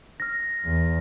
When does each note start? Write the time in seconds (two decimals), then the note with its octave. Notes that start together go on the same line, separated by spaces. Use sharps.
0.20 F6 A#6
0.66 E2